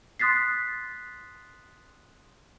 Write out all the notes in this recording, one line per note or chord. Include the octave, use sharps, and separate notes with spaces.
C6 D#6 F#6 A6 B6 C7